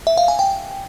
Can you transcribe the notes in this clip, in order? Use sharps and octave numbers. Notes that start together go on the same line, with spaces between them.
E5
F5
G#5
G5